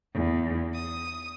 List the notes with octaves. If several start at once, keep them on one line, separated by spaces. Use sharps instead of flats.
E2
D#6